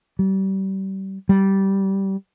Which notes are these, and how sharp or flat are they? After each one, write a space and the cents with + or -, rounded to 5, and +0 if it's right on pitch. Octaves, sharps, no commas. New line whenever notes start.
G3 -30
G3 -15